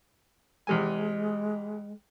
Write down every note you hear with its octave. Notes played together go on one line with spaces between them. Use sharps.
E2 C3 G#3 G#5